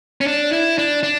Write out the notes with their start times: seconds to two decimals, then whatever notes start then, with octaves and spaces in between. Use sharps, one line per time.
0.21 C#4
0.27 D4
0.52 E4
0.78 D4
1.03 D4